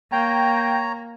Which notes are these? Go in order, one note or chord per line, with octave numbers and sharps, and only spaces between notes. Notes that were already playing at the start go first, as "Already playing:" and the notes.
A#3 C#5 G5 A#5